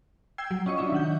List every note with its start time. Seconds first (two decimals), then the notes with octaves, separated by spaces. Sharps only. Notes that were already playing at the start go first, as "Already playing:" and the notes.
0.38 G5 E6 G#6 C7
0.51 F#3
0.66 C#4 F4 D#5 C#6
0.78 F#3 D4 D#4 E5
0.92 D#3 F#5 G6